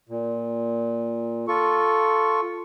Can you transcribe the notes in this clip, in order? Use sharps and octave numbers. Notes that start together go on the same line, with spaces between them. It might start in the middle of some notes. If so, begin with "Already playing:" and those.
A#2
F4 A4 C#6